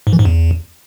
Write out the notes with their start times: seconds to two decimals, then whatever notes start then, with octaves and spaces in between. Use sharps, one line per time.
0.07 G#2
0.13 E3
0.19 G#2
0.25 E2